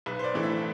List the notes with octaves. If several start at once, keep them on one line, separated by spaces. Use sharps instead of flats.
B1 B4
C5
D5
A2 E3 A3 D4
E5